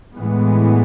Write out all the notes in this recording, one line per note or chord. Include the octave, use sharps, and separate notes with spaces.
A2 E3 G#3 B3